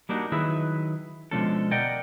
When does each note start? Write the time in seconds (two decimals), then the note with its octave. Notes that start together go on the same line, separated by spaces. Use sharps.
0.09 G3 A#3 D4 D#4 F#4
0.32 D#3 F#3 E4 G#4 B4 E5
1.31 B2 D3 F3 G#3 C#4 A4
1.71 A#4 D5 D#5 F#5 G5